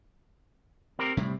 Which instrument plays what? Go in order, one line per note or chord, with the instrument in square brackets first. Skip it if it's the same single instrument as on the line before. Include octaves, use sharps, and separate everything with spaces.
[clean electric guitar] C4 G4 A#4
[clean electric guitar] A2 [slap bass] C3 G3 C4